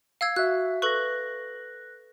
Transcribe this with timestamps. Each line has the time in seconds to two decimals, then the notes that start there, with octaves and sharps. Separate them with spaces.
0.21 F5 E6 G#6
0.36 F#4 E5 F#6
0.82 A4 B4 C#6 F#6 A#6